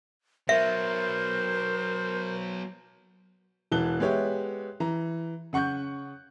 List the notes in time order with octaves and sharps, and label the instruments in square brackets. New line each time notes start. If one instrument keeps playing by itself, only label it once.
[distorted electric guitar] F#3 B3 [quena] A#4 [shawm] C5 [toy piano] E5
[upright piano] E1 E3 A5 F#6 G7
G#3 B3 G4 C#5 E5
E3 A#5
C#3 F#5 C#6 F#6 G6